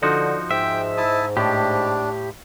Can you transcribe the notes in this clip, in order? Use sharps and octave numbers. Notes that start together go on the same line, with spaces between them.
D3 F3 D#4 F#4
G#2 E5 G5
E4 A5 D#6
A2 D4 G4